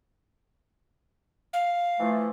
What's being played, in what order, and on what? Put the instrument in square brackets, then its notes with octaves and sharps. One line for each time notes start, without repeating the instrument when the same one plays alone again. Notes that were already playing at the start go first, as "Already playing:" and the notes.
[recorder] F5
[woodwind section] E3 F3 A3